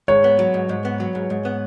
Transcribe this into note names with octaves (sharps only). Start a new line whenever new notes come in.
G#2 C#5
B3
F#3
G#2
G#2
B3
F#3
G#2
G#2
B3